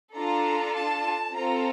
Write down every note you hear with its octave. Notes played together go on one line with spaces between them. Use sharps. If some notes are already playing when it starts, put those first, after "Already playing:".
D4 F4 A4 A#5
A5
C4 F4 A4 A#5